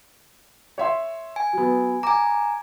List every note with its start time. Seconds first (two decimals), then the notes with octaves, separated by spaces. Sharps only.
0.78 C#5 E5 C6
1.36 G#5
1.53 F#3 B3
2.03 G#5 A#5 D6